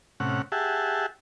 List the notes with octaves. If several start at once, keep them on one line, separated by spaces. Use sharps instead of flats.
A2 C3 C#4 F#5
G4 G#4 E5 F#5 A5